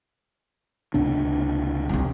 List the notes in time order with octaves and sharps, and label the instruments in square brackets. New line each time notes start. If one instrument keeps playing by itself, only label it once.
[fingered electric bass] C#2 C3 D4
[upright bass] C2 C4